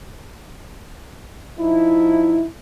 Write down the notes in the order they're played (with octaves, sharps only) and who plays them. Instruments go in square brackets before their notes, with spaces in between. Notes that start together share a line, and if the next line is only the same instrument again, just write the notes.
[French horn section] F3 D#4 E4